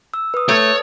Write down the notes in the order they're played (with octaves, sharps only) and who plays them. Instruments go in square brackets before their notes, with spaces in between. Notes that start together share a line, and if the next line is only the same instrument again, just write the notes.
[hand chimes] E6
B4 D#6
[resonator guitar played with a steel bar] A3 [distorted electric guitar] C#5